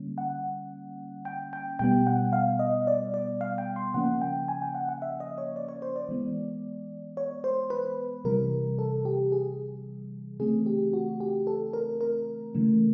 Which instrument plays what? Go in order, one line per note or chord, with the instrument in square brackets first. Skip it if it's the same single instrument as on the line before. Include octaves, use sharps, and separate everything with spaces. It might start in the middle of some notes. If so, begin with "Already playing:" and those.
Already playing: [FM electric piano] D3 G3 A#3 C#4
F#5
G5
G5
B2 G3 B3 G5
F#5
F5
D#5
D5
D5
F5
G5
C6
C#3 F3 A#3 C#4 F#5
G5
G#5
G5
F#5
F#5
E5
D#5
C#5
D5
C#5
C5
D5
E3 G#3 B3
C#5
C5
B4
C3 E3 G3 A#4
A4
G4
G#4
C#3 E3 A3 C4 G#4
G4
F#4
G4
A4
A#4
A#4
C#3 E3 A3